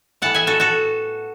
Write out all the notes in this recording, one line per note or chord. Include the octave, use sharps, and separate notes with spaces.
A2 E3 B3 F#5 A5
E5 G#5
F#4 A4
F#4 A4